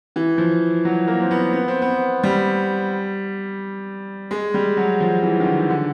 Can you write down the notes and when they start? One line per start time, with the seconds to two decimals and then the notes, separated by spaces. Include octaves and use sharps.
0.16 E3
0.38 F3
0.85 F#3
1.07 A#3
1.20 C4
1.31 B3
1.53 B3
1.68 C4
1.82 B3
2.24 G3
4.31 G#3
4.54 G3
4.77 F#3
5.00 F3
5.23 E3
5.40 D#3
5.46 D3
5.70 D3